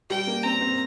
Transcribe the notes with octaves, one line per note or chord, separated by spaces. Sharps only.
G3 G5
A#3
C4 A#5
C4